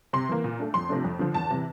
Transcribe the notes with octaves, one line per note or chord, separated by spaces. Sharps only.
C3 C6
E3 A#3
A#2
A3 D4
F2 C6
C3 F3 A3 D4
F2
D3 F3
E2 A5
C3 E3